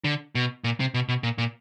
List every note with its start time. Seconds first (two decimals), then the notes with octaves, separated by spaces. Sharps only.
0.04 D3
0.35 B2
0.64 A#2
0.80 C3
0.94 B2
1.09 B2
1.23 A#2
1.38 A#2